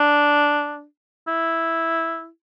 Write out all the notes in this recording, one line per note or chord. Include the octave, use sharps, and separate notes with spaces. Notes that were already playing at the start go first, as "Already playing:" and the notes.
Already playing: D4
E4